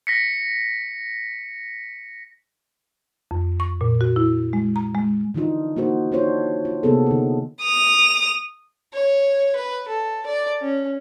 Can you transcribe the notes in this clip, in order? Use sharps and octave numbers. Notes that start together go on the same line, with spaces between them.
A#6 B6 C#7
F2
C#6
A#2
F#4
E4
G#3
A#5
G#3
D3 E3 D4 D#4 F4
A#3 D#4 F#4 C5
D4 D#4 F4 C5 C#5
F4
C3 A#3 B3 G#4 A4
D3 D#4
D#6 F7
C#5
B4
A4
D5
C#4